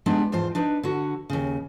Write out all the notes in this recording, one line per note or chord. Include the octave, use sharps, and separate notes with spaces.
G3 G#3 B3 D4 D#4
E2 G#2 F4 C5 A5
D4 D#4 B4
D3 F#4
D#2 C#3